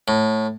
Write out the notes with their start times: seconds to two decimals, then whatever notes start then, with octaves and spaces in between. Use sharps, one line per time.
0.08 A2